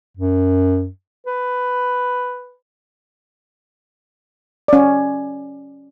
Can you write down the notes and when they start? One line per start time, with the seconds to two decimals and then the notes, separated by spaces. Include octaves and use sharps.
0.17 F#2
1.27 B4
4.68 C#4 D5